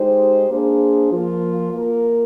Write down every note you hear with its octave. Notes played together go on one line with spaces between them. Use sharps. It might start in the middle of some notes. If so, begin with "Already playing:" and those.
Already playing: G#3 D#4 G4 C5
A#3 D4 G#4 C5
F3 A#3 F4
A#3 F4 A#4